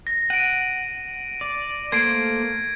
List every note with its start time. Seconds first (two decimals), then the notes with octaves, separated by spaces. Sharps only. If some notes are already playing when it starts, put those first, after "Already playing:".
0.07 A#6
0.30 F#5 D7 D#7
1.41 D5
1.92 A3 A#3 C5 G#6 C7 D7